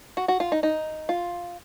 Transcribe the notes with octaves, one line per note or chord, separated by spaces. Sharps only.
F#4
F#4
F4
D#4
D#4
F4